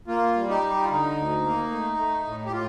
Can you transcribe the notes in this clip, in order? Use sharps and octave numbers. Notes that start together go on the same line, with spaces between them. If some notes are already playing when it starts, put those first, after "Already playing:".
A#3 F4
G3
D#4 G4
G3
F4
D3 D#4
D2
A#3
A3
A3
A2
G4
A2 F4